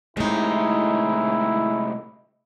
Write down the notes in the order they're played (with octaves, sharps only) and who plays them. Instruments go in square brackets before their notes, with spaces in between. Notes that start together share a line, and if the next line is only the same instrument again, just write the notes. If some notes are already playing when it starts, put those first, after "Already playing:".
[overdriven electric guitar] A2 C3 [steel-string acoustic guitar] G#3 D#4 [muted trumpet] E4